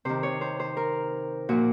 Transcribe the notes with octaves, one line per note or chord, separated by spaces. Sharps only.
C3 D#3 C5
C#5
C5
C5
A#4
A#2 F3 F#4